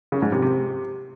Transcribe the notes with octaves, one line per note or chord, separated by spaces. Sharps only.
C#3
G#2
C3
C3